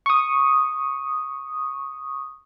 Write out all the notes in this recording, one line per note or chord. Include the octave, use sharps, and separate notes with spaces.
C#6 D#6